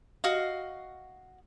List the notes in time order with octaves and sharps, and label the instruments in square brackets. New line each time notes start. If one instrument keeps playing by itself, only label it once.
[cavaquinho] F#4 D#5 F5